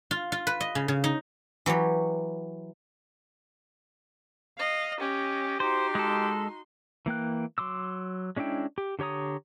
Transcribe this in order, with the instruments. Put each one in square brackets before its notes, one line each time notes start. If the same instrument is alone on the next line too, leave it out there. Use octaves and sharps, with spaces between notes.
[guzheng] F4
F4
B4
D#5
C#3
C#3
D#4
E3 F#3 G4 C#5
[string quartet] D#5 F5
[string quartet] C#4 D#5 [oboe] G4
[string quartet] D#4 F#4 C6 [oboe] G4 [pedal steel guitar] C5
[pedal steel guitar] G#3 A4
E3 A#3 G5 F#6
F#3 C6 D6 E6
G#3 C#4 D4 E4 G5
G4
D3 G4 C#5 A#5 D#6